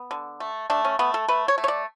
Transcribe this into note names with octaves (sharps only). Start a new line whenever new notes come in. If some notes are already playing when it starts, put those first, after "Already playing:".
Already playing: B3
D3
A3
A3 D4
C#4
A3 B3
A4
A3 B4
C#5
A3
C#5
D5